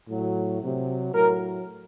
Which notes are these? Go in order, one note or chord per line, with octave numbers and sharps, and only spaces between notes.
A2 F#3
C3 F#3
A2 F#3 A#4